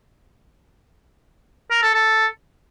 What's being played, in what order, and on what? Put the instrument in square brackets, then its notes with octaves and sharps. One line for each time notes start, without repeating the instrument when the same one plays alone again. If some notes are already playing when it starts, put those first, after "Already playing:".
[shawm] A#4
A4
A4